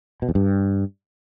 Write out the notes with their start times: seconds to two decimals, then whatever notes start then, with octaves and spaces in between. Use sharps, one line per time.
0.22 B2
0.29 E2
0.35 G2